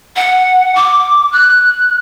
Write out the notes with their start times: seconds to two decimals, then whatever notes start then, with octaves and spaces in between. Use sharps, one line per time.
0.16 F#5
0.76 D6
1.32 F#6